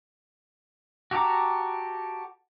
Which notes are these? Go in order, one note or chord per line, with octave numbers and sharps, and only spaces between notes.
F#4 G4 A4 A#5 D6